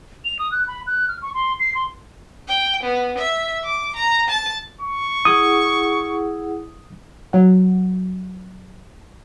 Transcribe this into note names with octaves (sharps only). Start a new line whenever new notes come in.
F7
D#6
F#6
B5
F#6
F6
C#6
C6
C7
C6
G5
B3
E5
D6
A#5
A5
C#6
E4 G#4 F#5 D#6
F#3 F#5